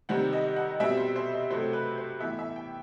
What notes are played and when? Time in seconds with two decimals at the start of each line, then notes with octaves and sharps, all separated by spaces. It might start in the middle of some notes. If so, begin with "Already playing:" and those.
0.09 C3 D#3 G3 C4 F#5
0.33 D#5
0.56 F#5
0.80 B2 G3 C4 E5
0.97 C5
1.16 C5
1.33 D#5
1.50 C3 F#3 A3 C4 C5
1.73 B4
1.98 C5
2.20 A2 E3 B3 E5
2.39 E5
2.56 G5